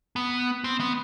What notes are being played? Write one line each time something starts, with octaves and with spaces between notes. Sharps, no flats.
B3
C4
B3